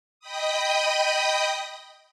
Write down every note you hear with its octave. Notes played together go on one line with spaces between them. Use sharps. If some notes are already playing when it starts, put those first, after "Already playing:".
D#5 G5 B5 D#6